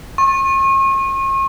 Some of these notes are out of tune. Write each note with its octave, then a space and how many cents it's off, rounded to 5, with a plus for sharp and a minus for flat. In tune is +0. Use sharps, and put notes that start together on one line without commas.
C#6 -40